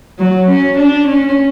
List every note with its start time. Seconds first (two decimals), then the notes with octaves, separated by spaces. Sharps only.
0.19 F#3
0.48 C#4
0.77 D4
1.07 C#4